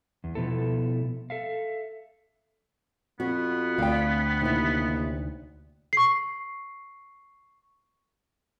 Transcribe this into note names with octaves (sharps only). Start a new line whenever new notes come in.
E2
B2 F3 B3 E4 A4
A4 E5 F5
F2 B3 F#4
D2 F5 G5
D#2 C3 E4
C#6 C7